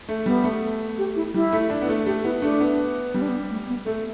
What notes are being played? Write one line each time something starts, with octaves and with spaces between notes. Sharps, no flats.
A3
G3 B3
A3
G4
E4
G3 E4
A3
D4
B3
A3
A3 G4
B3 E4
A3 D4
B3
G3 B3
D4
B3
A3
B3
A3 A4